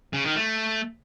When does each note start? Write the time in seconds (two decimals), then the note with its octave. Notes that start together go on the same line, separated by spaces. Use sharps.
0.13 C#3
0.25 D#3
0.36 A3